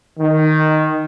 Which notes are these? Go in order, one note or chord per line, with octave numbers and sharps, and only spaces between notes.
D#3